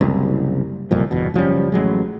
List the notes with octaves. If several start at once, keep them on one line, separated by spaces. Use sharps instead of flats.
F#1 C2
F#1 C2 F2 A#2
G1 E2 B2
F#1 F3 G3 C#4
A1 F#3 G#3